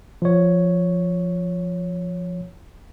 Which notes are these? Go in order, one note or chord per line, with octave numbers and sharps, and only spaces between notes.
F3 C#5